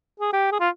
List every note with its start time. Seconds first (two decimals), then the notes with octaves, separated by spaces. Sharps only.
0.20 G#4
0.33 G4
0.52 G#4
0.60 F4